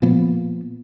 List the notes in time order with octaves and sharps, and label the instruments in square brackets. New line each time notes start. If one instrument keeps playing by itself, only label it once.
[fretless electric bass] A#2 F3 A#3 B3